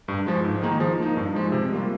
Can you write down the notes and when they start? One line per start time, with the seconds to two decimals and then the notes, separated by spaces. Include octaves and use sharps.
0.08 G2
0.27 F3 G#3
0.44 G#2
0.62 D#3 A#3 D#4 G#4
0.80 F3
0.99 A#3 D#4
1.17 G2
1.35 F3 G#3
1.52 C3
1.71 G3 A#3 F4